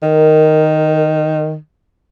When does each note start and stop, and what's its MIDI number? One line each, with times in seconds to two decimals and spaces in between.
0.03 1.56 51
0.03 1.38 70